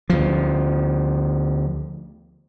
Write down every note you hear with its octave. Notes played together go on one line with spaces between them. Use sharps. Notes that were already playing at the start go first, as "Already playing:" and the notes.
D2 F3